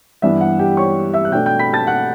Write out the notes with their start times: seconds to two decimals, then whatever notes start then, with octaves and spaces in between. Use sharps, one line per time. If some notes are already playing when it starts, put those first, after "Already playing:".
0.22 G2 E3 B3 D4 E5
0.41 F#5
0.59 G4 G5
0.77 C#5 C#6
1.14 E5 E6
1.25 F#6
1.32 B2 A3 D4 G5 G6
1.46 G5 G6
1.59 B5 B6
1.73 A5 A6
1.87 F#5 F#6